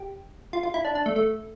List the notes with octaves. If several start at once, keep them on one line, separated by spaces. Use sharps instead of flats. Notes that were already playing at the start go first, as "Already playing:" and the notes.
Already playing: G4
F4
F4
E4
D4
D4
A3
A3